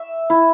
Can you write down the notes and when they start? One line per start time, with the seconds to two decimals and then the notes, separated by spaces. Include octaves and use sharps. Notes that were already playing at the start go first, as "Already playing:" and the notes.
Already playing: E5
0.30 E4